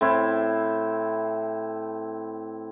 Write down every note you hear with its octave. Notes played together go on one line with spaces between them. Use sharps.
A2 C4 E4